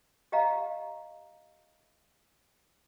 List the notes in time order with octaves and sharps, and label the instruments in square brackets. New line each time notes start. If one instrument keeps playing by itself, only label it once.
[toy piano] G4 D#5 F5 F#5 A#5